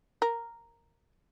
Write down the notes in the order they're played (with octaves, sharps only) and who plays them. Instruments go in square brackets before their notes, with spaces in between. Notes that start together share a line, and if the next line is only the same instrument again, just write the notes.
[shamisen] A#4